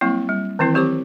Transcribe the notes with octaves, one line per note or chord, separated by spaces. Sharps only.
F#3 G3 A#3 C4 E4
G3
D#3 E3 C4 E4
F#3 C4 G4 C5 D6